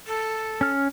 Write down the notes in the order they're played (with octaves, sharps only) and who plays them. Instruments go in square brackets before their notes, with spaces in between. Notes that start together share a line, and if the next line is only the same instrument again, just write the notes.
[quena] A4
[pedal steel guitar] C#4 F6